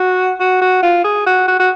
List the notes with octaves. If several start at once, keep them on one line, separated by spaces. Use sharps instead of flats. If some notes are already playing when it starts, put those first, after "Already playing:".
Already playing: F#4
F#4
F#4
F4
G#4
F#4
F#4
F#4